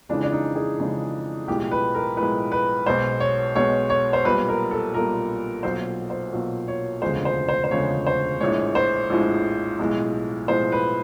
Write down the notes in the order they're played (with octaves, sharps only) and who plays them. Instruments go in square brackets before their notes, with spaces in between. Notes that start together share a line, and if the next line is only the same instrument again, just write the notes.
[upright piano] F2 C#3 E3 G#3 D4
D4
D#4
G#4
F2 C#3 E3 G#3
B1 A2 F3 G#3 G4
B4
A#4
B1 A2 F3 G#3 B4
B4
B1 B2 G#3 C5
C#5
B1 B2 G#3 C#5
C#5
C5
B1 A#2 G3 B4
A#4
A4
B1 A#2 G3 A#4
B1 A#2 F#3 C5
C5
B1 A#2 F#3
C#5
E1 D2 C#3 F3 G#3 C5
C5
C5
C5
E1 D2 C#3 F3 G#3 C#5
C5
A#1 A2 F3 G#3 C#5
C5
A#1 A2 F3 G#3
B1 A2 F3 G#3
B1 A2 F3 G#3 C5
B4